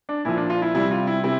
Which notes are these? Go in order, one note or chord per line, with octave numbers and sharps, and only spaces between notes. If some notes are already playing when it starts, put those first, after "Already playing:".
D4
A#2 F3 E4
D4
F4
E4
C3 G3 E4
F4
E4
C3 E4